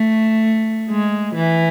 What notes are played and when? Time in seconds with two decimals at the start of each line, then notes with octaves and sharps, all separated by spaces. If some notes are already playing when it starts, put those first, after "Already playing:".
Already playing: A3
0.89 G#3
1.35 E3